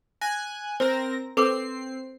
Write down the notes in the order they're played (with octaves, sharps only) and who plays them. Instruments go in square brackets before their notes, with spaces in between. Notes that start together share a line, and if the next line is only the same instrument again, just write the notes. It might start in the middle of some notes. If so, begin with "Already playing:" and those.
[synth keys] G#5 F#6 [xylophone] A#6
[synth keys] C4 A#4 A#6 [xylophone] C5
[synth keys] C4 C7 [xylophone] A4 B4 D6